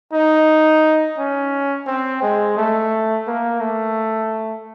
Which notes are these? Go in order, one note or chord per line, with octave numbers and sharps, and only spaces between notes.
D#4
C#4
C4
G#3
A3
A#3
A3